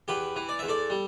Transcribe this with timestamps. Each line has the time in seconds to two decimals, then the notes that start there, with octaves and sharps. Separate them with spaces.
0.08 E2 G4 B4
0.36 E3
0.49 D5
0.59 E2 E5
0.68 A4 D5
0.90 G3